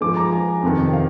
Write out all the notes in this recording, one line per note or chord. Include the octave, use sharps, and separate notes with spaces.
G#2 F3 G#3 D6
A#5
G#5
F2 C3 D#3
F5